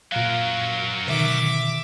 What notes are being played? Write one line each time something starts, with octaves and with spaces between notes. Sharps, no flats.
A#2 F#3 A#4 F5
B2 D3 D#3 E5 D6